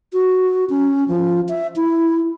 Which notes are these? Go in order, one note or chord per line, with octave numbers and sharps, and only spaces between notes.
F#4
C#4
F3
E5
E4